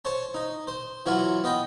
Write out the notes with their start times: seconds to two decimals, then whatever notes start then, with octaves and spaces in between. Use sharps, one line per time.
0.05 C5 C#5 A5
0.34 D#4
0.67 C5
1.06 E3 F#3 F4 F#4
1.44 B3 D#5 G5